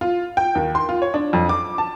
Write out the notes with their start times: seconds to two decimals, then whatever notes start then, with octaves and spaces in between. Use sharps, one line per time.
0.01 F4
0.37 G5
0.55 D#2
0.75 C6
0.89 F4
1.02 C#5
1.14 D4
1.33 F2
1.49 D6
1.78 A5